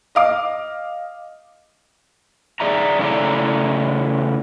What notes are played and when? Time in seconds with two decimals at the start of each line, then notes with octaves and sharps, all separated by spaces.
0.15 D#5 F5 D6
2.60 G#4 D5 E5 A#5
2.99 C#3 A3 E4 D5 A#5